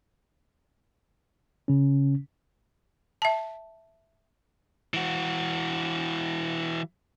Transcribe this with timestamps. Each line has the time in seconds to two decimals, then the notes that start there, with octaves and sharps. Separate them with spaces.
1.68 C#3 C#4
3.22 E5 A5
4.94 E3 F#4